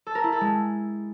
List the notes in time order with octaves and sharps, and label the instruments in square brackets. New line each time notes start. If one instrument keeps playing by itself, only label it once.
[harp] A4
A#4
E4
A4
G#3